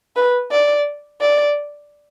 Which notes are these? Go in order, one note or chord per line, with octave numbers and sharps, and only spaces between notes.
B4
D5
D5